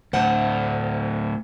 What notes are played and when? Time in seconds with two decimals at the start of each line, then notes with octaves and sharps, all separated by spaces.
0.13 D2 A2 C5 F#5 A5